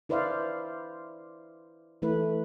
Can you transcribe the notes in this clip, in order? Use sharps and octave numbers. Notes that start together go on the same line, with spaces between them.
E4 B4 C5 D5 E5 F5
E3 A3 E4 B4